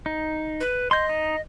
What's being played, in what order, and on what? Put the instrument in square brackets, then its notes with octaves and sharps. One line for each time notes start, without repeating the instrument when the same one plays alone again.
[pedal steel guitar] D#4
[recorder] B4
[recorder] D#5 [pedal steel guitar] C6 G6
[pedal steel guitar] D#4